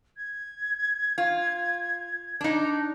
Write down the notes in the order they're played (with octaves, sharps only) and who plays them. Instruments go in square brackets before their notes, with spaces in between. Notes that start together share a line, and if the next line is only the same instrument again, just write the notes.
[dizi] G#6
[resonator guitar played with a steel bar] F4
D4 D#4